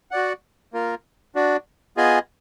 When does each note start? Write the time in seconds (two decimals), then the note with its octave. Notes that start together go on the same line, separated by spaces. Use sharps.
0.11 F#4 D5 F#5
0.73 A#3 F4 A#4
1.35 D4 F#4 D5
1.97 B3 F4 G#4 D#5 G#5